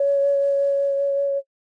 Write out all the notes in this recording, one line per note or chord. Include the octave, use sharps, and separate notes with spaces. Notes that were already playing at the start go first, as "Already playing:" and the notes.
Already playing: C#5